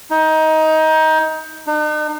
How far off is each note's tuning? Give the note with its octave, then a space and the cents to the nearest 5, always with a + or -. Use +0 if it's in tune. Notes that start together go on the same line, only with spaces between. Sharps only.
D#4 +20
D#4 -45